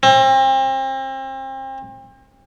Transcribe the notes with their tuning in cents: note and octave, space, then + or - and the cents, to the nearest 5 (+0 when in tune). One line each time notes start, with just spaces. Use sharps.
C4 +35